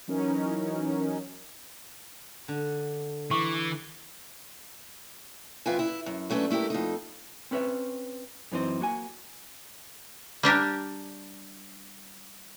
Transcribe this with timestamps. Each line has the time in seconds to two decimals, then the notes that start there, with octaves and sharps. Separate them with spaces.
0.08 E3 F#3 C#4 D#4 A#4
2.48 D3
3.31 E3 C#6 D6
5.66 F2 F4 B4 E5 G5 G#5
5.79 E4
6.06 F#2
6.30 F#3 A3 C#4 D4 B4
6.50 A3 E4 F4 G4 A#4
6.70 F2 D#4
7.51 C4 C#4 B4 C#5 E5
8.52 F#2 E3 C4 D#4 C5
8.81 A#3 F#4 G#5
10.43 G3 D4 G4 A#4